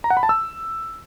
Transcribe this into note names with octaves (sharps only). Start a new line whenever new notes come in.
A#5
F#5
B5
A5
E6